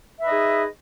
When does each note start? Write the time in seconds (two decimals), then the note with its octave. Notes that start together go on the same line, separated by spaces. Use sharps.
0.20 E5
0.23 B4
0.26 D#5
0.29 D#4
0.32 G#4